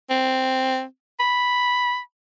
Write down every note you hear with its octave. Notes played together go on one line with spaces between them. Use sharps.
C4
B5